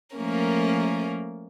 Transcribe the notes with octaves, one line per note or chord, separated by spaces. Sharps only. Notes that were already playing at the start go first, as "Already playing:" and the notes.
F3 A3 A#3 C#4 A#4